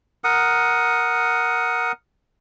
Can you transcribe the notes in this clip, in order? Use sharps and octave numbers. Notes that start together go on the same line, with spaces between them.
A#4 F#5 D#6